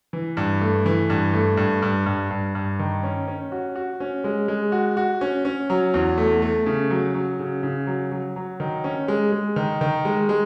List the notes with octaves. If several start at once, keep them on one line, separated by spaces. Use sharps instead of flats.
E3
G2
A3
E3
G2
A3
G2
G2
G2
G2
G2
D#3
C#4
C#4
F#4
F#4
C#4
G#3
G#3
F#4
F#4
C#4
C#4
F#3
E2
A3
A3
C#3
F#3
F#3
C#3
C#3
F#3
F#3
F#3
D#3
C#4
G#3
G#3
D#3
D#3
G#3
G#3